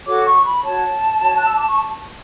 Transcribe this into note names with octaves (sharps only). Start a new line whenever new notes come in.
F#4 A4 C#5 D6
C#6
B5
F#4 C#5 A5
F#4 C#5
F#6
E6
D6
C#6